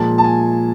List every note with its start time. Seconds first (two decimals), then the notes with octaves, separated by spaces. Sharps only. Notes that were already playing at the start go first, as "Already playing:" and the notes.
Already playing: A#2 F3 G#3 A5
0.18 A5
0.24 G#5